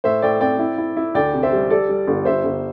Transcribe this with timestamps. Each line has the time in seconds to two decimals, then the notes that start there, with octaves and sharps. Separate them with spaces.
0.04 A2 C5 E5
0.22 A2 D5 G5
0.41 C4 D5 G5
0.59 E4
0.78 E4
0.97 E4
1.15 D2 D5 G5
1.34 C3
1.43 C5 E5
1.53 G3
1.70 G3 A4 D5
1.89 G3
2.08 G1
2.25 G1 C5 E5
2.44 G1